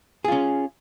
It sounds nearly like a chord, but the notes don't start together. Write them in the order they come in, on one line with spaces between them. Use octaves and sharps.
G#4 F4 C#4